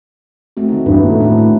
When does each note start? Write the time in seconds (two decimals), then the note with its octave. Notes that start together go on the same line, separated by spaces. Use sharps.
0.57 A3 C4 F#4
0.69 D#3 D#4
0.86 E2 G2 F#4 B4
1.03 A2 D#3 A#3
1.21 D4 F#4 B4
1.38 D4